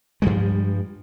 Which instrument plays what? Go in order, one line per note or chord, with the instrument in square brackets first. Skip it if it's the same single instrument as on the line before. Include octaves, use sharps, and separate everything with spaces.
[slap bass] G2 F3 G3 G#3